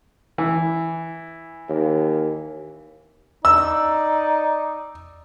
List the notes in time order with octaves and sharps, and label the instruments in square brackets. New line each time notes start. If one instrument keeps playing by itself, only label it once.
[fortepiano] E3
[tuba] D#2
[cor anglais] D#4 [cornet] D5 [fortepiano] E6